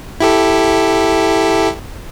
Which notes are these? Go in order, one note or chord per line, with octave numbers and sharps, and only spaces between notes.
E4 G4 A4